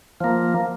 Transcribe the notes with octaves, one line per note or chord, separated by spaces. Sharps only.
F3 A#3